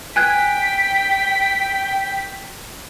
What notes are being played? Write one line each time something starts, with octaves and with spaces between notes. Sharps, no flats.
G5 G#5 F#6 G#6 B6